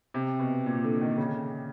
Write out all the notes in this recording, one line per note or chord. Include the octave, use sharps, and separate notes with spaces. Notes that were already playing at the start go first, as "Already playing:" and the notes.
C3
B2
A#2
D3
D#3
C#3